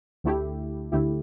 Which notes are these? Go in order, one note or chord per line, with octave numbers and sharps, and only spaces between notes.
D2 D3 A3 E4 G4
D2 D3 A3 E4 G4